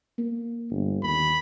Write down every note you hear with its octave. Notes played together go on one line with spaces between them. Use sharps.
A#3
G1
D#2 B5